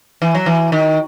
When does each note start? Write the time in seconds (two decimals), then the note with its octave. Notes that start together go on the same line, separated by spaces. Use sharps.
0.22 E3
0.35 F#3
0.46 E3
0.72 D#3